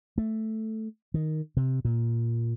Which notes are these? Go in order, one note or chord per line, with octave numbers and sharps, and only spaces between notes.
A3
D#3
C3
A#2